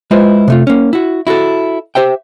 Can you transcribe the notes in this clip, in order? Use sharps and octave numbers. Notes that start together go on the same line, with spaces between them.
G#3 E4 F4 B4 C5
C3 A3 F4
A#3 C#4
E4 F#4
E4 F#4 G4 A4
G4 C5 E5 G5